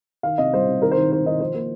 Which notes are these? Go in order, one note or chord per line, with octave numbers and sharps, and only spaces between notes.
D#3 F5
C3 D#5
G3 C5
C3
D#3 A#4
C5
D#3
D#3 C5
D#3 D#5
F3 C5
A#3